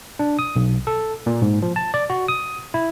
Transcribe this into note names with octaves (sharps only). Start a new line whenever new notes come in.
D4
D#6
B1
A4
A#2
G#2
F3
A5
D5
F#4
D#6
E4